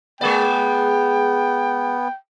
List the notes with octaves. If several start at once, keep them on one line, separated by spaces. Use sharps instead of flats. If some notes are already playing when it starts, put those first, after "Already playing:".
G#3 B3 G#4 D5 G5